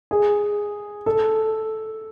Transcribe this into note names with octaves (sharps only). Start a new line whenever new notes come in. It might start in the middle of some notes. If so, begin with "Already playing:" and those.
G#4
A4